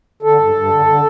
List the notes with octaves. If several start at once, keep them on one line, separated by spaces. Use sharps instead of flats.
D3 A4
G2
G2
D3
D3